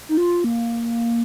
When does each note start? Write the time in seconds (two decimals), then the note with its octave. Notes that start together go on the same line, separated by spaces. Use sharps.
0.09 D#4
0.17 F4
0.44 A#3